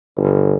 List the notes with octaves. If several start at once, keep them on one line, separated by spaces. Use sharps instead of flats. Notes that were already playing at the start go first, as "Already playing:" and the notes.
G1